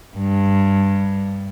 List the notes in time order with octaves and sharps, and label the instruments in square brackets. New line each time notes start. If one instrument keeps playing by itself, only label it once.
[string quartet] G2